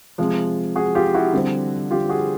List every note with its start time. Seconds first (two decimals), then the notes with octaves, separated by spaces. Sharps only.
0.18 C3 F3 G#3
0.76 F#4 G#4
0.95 F4 G4
1.14 E4 F#4
1.33 D3 G3 C4
1.91 F4 G4
2.09 F#4 G#4